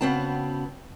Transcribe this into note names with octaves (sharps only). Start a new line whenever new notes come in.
C#3 B3 C4 F#4 A5